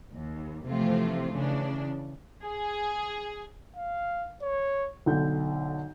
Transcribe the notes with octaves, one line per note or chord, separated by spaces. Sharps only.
D#2
C3 E3 F3 A3 C4 F4
C#3 E3 D4
G#4
F5
C#5
B1 D3 G6